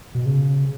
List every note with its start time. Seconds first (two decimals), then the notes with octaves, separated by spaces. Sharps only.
0.15 B2
0.26 C#3